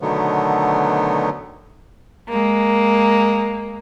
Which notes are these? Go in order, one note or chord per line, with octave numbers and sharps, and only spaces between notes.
B2 D3 D#3 F#3 A3 B3
G#3 A#3